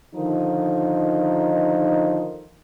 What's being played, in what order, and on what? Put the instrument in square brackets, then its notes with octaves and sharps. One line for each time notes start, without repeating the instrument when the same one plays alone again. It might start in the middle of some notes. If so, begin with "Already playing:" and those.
[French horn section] D3 D#3 F3 D#4